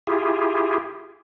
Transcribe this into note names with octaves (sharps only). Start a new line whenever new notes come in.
E4 F4 G4 G#4